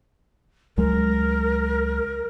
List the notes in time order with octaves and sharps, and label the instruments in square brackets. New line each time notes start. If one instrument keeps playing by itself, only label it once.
[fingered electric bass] C#2 F#3 G#3 [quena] A#4